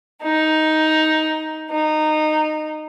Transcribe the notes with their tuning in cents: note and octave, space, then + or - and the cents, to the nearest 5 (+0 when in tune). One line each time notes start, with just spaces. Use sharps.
D#4 +10
D#4 -15